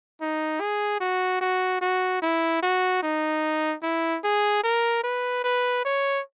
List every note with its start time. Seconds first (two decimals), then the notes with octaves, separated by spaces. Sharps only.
0.21 D#4
0.60 G#4
1.01 F#4
1.41 F#4
1.81 F#4
2.22 E4
2.63 F#4
3.03 D#4
3.83 E4
4.24 G#4
4.64 A#4
5.04 B4
5.44 B4
5.85 C#5